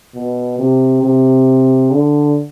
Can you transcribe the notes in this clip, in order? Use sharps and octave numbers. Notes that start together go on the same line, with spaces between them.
B2
C3
C3
D3